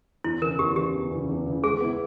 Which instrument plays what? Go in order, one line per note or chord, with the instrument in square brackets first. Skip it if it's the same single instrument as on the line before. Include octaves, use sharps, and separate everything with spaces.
[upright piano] E2 [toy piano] E4
[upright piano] C#3 E3 [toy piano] A#4
[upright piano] E2 [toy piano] G4
[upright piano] C#3 E3 [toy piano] G4
[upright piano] E2
C#3 E3
E2
C#3 E3
[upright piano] G#3 [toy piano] G#4
[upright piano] B3 E4